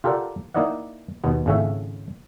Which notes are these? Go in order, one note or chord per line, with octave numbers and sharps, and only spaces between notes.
F4 G4 A4 A#4 D5 F#5
A#3 D#4 E4 D5 D#5 F#5
D#2 B2 B3
G#1 A2 C#3 A3 C#4 E5